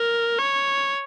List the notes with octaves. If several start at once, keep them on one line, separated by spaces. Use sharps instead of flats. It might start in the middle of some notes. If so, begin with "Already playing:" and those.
Already playing: A#4
C#5